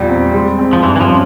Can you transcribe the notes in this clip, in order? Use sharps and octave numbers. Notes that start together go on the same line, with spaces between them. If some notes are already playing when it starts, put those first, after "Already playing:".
Already playing: E2 A#2 G3
C4
G#3
C4
F3
G2 E3
E3
F3
C#4